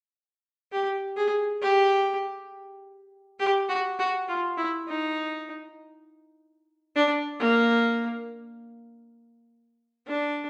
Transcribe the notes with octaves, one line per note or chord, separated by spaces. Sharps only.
G4
G#4
G4
G4
F#4
F#4
F4
E4
D#4
D4
A#3
D4